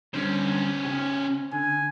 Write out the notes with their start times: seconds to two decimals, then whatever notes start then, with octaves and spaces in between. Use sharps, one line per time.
0.14 D3 G3 C#4 C5
0.84 C#3 G4
1.53 D3 G#5